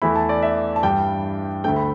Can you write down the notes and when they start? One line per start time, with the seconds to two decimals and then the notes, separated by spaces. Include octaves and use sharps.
0.02 E2 E3 A3 E4 B5
0.16 A5
0.29 D5
0.42 E5
0.76 A5
0.83 G2 E3 G3 D4 G5
1.64 D2 D3 A3 G5
1.76 B5